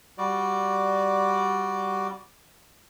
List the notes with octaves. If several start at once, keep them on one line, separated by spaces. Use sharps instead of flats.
G3 F#4 D5